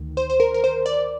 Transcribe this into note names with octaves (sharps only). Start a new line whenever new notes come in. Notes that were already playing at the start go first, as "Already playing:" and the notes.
Already playing: D2 D#3
C5
C5
A#4
A#4
C5
D5